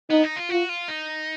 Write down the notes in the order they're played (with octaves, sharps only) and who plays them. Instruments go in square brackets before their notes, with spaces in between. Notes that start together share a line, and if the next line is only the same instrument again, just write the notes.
[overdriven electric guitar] B3 [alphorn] D#4
[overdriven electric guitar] D#4
F4
[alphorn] F4 [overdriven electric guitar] F#4
[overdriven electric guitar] F4
D#4